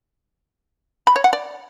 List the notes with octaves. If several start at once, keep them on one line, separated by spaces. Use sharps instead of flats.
B5
C#5
F#5
D5